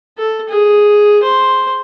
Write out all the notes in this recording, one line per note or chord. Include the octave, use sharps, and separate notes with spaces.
A4
G#4
C5